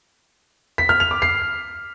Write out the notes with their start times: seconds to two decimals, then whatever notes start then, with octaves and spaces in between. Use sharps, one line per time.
0.78 B6
0.89 F6
1.00 F7
1.11 D6
1.22 C7